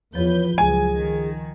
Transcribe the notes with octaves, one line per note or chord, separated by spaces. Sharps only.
E2 F3 F4 B4 C#5 G6
C#2 F#3 G#4 G#5
D#3